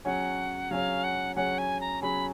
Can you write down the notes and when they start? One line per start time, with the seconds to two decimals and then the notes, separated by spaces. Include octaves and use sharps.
0.05 F#3 C#4 G#4 C#5 F#5
0.71 F#3 C#4 G#4 C#5 F5
1.04 F#5
1.36 F#3 C#4 G#4 C#5 F#5
1.58 G#5
1.81 A#5
2.02 F#3 C#4 G#4 C#5 B5